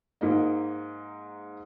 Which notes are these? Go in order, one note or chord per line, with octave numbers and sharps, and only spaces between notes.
G#2 A#3 D#4